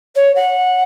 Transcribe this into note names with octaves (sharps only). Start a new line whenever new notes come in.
C#5
F#5